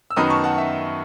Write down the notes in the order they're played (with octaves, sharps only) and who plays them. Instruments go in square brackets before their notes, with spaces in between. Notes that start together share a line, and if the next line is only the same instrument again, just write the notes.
[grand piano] E6
F#2 D#3 F#3 B3 D#4 B5 D#6
A5 C#6
F#5 A5
E5